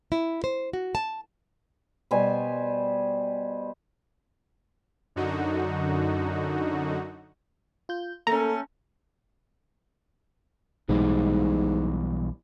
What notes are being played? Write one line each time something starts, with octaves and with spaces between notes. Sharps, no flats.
E4
C5
F#4
A5
B2 G3 C5 G#5
F#2 D3 D#4 F#4
F4 G6
A3 A#3 C#4 A4 A#5
B1 G#2 B2 E3 G3